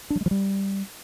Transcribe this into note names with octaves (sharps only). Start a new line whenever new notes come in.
D4
F#3
G#3
F3
G3